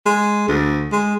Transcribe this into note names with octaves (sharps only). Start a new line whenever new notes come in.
G#3
D2
G#3